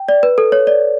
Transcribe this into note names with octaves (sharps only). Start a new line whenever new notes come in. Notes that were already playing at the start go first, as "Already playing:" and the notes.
Already playing: G5
D5
B4
A4
C#5
D5